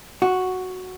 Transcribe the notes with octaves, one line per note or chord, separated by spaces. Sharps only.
F#4